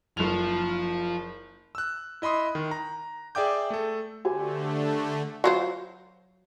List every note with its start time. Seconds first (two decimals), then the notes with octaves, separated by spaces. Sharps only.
0.17 F#1 F3 F7
1.75 E6 F#6
2.22 E4 D#5 B5 C6 D#6
2.55 D#3
2.71 A#5
3.35 G#4 D5 E5 G5 D6 G6
3.70 A3 A4
4.25 D3 A3 G4 C5 G#5
5.44 F#3 F4 C5